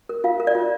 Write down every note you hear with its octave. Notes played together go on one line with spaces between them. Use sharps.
A#4
F4 F5
A#4
D5
F4